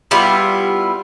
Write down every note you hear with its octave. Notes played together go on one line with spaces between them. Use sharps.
G3 B3 E4 F4